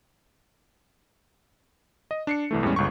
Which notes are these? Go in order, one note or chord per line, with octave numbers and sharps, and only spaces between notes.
D#5
D4 C7 C#7
C2 E3 A3
E2 A2 G3 G#3 C#4
G1 C#2 C#6